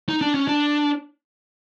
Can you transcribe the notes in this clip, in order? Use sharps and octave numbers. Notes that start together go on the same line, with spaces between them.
D#4
D4
C#4
D4